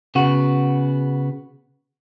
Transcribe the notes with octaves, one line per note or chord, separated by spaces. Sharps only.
C#3 B3 F#4